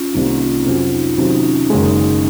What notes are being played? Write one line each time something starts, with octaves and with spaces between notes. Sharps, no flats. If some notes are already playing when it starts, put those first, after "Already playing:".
Already playing: C#4 F4
C2 C3 D#3 A#3
C4
C#4
F4
D#4
F2 C3 F#3 C#4 F4 F#4
D#4
C3 D#3 F#3 C#4
D#4
C#4
D#4
F#1 F#2 D#3 G#3 C#4
D#4
C#4